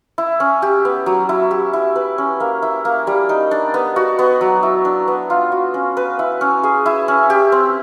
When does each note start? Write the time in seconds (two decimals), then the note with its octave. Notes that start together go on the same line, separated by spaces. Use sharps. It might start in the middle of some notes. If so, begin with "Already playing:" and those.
0.18 E4
0.40 C#4
0.62 G4
0.85 B3
1.06 F#3
1.29 E4
1.51 G4
1.73 E4
1.96 B4
2.18 C#4
2.40 A#3
2.63 E4
2.85 A#3
3.07 G3
3.29 D#4
3.51 D4
3.74 B3
3.96 F#4
4.19 B3
4.41 F#3
4.63 E4
4.85 D4
5.08 B3
5.30 F4
5.52 F#4
5.74 C#4
5.97 B4
6.19 E4
6.41 C#4
6.63 G#4
6.86 E4
7.08 C#4
7.30 G4
7.52 C4